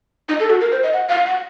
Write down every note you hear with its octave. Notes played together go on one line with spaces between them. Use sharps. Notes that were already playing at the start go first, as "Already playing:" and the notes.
D#4
A4
F#4
A#4
C5
D#5
F#5
F5
F#5